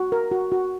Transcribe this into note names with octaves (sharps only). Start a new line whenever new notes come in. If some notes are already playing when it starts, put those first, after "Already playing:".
Already playing: F#4
A#4
F#4
F#4